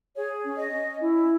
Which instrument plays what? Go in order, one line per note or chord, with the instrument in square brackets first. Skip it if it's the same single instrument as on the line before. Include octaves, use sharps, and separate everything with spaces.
[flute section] G#4 C#5
C#4
D#5
C#4
E4